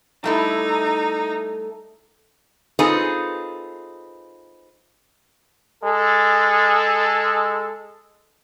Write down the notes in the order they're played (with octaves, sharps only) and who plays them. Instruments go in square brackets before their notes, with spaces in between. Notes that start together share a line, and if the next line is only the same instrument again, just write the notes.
[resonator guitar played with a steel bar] G3 A3 E4 [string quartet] D#4
[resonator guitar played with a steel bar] C4 D#4 F4 G#4 A4 B4
[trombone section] G#3 A4